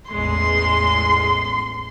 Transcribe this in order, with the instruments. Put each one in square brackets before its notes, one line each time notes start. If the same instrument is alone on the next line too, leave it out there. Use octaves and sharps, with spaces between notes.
[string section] A1 E2 G#3 [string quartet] C6